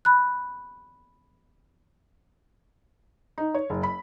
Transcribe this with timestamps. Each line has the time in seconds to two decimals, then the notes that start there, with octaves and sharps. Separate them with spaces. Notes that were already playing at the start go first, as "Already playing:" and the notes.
0.05 B5 F#6
3.38 D#4
3.54 C#5
3.70 F#1
3.83 B5